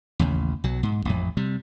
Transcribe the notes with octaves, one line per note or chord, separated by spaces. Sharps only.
A1 D#2 C#3
B1 F#3
G#2
A1 F2
C3 G3